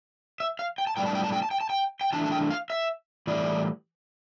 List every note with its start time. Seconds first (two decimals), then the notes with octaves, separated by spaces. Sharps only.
0.40 E5
0.59 F5
0.78 G5
0.87 A5
0.96 A2 G3 B3 D4 G5
1.06 A5
1.15 G5
1.24 A5
1.33 G5
1.43 A5
1.51 G5
1.61 A5
1.70 G5
2.01 G5
2.13 E3 A3 D4 A5
2.26 A5
2.32 G5
2.50 F5
2.70 E5
3.27 A2 E3 G3 D5